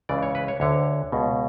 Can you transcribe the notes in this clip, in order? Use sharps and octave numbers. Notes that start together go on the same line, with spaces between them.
C#2 C#3 E3 D5
C#5
B4
C#5
D2 D3 C#5
C#2 B2